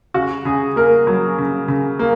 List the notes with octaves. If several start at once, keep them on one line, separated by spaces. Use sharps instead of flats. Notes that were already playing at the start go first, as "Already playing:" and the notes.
C#3 F#4
C#3 G#4
A#3 A#4
F#3
C#3
C#3
A#3